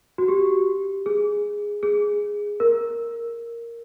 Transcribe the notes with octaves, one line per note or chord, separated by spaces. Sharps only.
F#4
G4
G#4
G#4
A#4